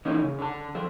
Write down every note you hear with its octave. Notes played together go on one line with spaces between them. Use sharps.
D3 E3 A#3 C#4 D#4
C#3
D3 A5
F3 A4